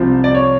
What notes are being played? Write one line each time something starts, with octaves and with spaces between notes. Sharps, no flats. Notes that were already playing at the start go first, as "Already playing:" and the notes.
Already playing: C2 C3 F3 C5
D5
C#5